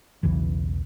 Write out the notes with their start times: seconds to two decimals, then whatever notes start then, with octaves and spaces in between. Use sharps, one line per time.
0.23 B1 E2 C#3 E3